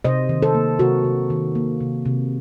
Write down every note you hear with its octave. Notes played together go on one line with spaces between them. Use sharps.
C3 C5 D#5
D#3
A4 C5
A#3
C3 F#4 A#4
C3
D#3
A#3
C3
C3